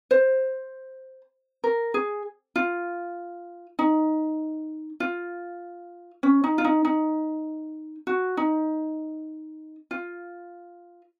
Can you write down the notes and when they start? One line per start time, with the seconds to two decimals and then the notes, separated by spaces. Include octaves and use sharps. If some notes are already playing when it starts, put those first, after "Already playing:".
0.11 C5
1.64 A#4
1.94 G#4
2.56 F4
3.79 D#4
5.00 F4
6.23 C#4
6.44 D#4
6.58 F4
6.64 D#4
6.85 D#4
8.07 F#4
8.37 D#4
9.91 F4